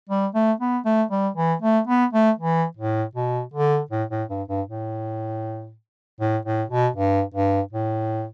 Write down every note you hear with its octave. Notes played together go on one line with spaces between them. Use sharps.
G3
A3
B3
A3
G3
E3
A3
B3
A3
E3
A2
B2
D3
A2
A2
G2
G2
A2
A2
A2
B2
G2
G2
A2